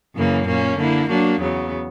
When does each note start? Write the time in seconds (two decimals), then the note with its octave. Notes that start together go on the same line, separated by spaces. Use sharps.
0.15 F#2 C#3 E3 A#3
0.47 A#2 A#3 C#4
0.77 D3 A#3 E4
1.08 F#3 A#3 D4 F#4
1.40 E2 C#3 F#3 B3